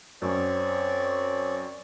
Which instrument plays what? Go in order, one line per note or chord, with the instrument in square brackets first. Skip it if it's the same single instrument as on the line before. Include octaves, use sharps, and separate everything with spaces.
[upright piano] F#2 [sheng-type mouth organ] C4 C#5 D5